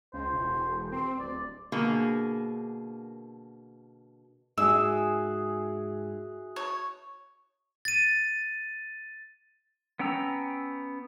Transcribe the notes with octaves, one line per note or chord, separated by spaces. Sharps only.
C#2 C5
E1
C4 C6
D1 D5
B2 D3 A#3 G#4
G#2 F#4 G#4 E5 E6
C#5
A6 D#7
B3 C#4 G5 A#5 E6